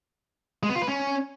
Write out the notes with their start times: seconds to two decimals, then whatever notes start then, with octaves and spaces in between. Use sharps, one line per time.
0.63 G#3
0.69 B3
0.75 F4
0.82 B4
0.88 C#4